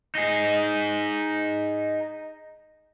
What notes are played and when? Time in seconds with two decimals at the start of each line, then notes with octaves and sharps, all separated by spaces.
0.15 D#4 G#4